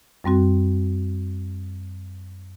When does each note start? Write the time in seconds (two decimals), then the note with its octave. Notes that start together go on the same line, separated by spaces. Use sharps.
0.24 F#2 G3 C4 F#4